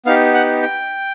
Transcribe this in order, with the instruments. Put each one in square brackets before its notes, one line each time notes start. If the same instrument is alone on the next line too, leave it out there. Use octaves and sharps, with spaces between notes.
[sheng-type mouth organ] B3 D#4 G4 F5
F#5
G5